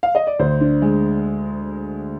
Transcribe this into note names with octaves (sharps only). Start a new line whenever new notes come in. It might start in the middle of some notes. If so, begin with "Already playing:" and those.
F5
D#5
D5
D2 C5
D4
G#3